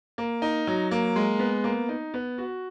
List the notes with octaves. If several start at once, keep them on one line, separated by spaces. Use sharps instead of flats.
A#3
D#4
F#3
A#3
G#3
B3
A#3
D#4
B3
F#4